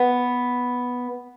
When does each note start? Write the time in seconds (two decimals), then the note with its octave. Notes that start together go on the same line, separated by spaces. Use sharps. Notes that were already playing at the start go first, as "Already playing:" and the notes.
Already playing: B3